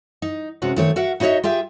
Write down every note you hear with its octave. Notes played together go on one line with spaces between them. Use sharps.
D#4
C3 G#3 C#4 F#4 B4
D#3 F#3 A3 C4 C#5
F#4 A#4 E5 F#5
D#4 E4 F#4 C#5 D#5 E5
F4 G4 G#4 E5 G5